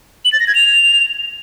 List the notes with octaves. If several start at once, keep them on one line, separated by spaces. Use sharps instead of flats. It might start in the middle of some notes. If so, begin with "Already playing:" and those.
F#7
A6
A#6
G#6
F7